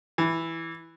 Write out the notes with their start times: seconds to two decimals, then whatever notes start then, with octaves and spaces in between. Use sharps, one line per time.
0.18 E3